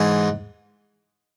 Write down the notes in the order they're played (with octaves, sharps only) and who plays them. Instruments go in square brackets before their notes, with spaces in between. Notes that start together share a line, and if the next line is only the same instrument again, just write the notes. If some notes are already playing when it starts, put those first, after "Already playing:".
Already playing: [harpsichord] G#2 E3 G#3